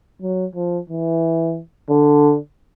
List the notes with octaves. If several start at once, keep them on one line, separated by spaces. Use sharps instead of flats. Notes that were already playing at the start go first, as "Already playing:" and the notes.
F#3
F3
E3
D3